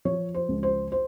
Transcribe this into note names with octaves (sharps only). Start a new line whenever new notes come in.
F3 C#5
C5
C#2
C5
C5